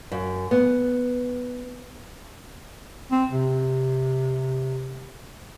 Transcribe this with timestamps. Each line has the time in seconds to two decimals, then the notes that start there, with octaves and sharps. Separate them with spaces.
0.11 F#2
0.51 B3
3.12 C4
3.31 C3